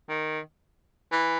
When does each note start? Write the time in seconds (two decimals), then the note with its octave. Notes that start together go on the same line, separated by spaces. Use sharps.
0.09 D#3
1.12 E3